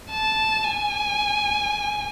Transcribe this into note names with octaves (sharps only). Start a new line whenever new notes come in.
A5
G#5